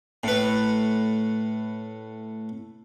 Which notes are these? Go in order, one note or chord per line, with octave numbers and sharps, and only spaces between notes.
A2 B4